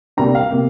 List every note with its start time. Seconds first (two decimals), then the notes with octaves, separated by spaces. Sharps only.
0.17 C3 G3 A#3 D4 A#5
0.35 F5
0.51 C3 A#3